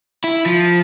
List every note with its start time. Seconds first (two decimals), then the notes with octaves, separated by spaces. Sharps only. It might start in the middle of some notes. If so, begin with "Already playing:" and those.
0.24 E4
0.46 F3